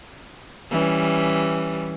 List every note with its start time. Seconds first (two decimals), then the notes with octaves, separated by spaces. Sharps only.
0.71 E3 G3 C#4